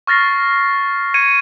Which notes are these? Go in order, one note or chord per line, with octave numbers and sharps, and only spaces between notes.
C#6 F6 A6 A#6 C7
G#6 C#7 D#7